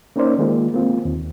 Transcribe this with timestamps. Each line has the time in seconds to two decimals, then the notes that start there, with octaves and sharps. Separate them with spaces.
0.16 A#3 C#4 D#4 A#4 C5 D5
0.38 D#3 G#3 A#3 F4
0.73 G#3 A#3 C4 F4
1.05 D#2